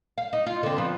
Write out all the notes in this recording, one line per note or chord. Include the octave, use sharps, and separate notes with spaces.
F5
D#4
F4
D3 C4
F3 B3